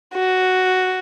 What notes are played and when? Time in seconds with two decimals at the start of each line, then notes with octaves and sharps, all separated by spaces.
0.14 F#4